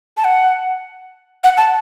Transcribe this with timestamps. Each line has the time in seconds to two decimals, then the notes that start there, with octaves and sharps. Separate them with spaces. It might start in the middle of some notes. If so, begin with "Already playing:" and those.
0.17 A5
0.24 F#5
1.44 F#5
1.57 A5